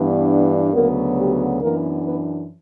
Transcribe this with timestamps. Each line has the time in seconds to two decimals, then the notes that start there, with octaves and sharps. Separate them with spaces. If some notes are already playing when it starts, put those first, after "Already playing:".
Already playing: G2 E3 B3 D4
0.73 D2 C#3 F#3 A#3 B3 A#4
1.17 G3 G4
1.60 F#2 E3 A#3 B3 D4 A#4
2.04 B3 B4